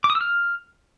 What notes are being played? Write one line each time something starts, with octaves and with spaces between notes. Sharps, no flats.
D6
D#6
E6
F6